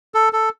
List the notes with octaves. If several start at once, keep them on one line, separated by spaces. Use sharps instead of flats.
A4
A4